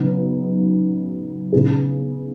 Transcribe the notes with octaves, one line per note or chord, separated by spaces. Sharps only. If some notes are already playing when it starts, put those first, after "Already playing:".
Already playing: C#3 F#3 B3 D#4
C#3 B3 D#4 G#4